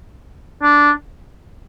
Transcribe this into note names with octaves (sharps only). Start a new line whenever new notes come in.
D4